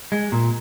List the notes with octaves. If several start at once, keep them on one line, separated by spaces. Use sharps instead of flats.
G#3
A#2